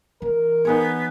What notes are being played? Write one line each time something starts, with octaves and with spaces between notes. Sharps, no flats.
E3 A#4
B3 D#4 G#4 C#5